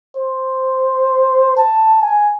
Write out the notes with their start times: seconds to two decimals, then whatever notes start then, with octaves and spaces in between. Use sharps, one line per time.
0.17 C5
1.57 A5
2.02 G#5